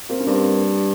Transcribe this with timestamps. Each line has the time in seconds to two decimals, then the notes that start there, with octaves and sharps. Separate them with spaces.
0.09 A#3 C4
0.20 C#4
0.27 G2 A#3 C4